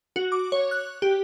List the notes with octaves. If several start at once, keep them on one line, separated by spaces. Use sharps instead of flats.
F#4
D6
C#5
F#6
G4